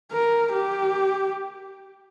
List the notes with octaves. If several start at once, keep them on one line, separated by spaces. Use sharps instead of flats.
A#4
G4